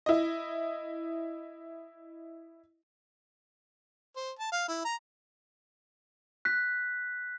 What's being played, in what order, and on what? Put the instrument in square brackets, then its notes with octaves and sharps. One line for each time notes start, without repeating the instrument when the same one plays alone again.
[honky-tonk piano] E4 D#5
[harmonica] C5
A5
F5
E4
A#5
[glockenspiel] F#6 B6